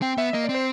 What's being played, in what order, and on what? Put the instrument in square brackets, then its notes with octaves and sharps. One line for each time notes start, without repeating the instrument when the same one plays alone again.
[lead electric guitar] C4 [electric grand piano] G5
[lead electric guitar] B3 [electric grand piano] E5
[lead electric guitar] A#3 [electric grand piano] D#5
[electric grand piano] D5
[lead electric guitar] C4
[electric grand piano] C5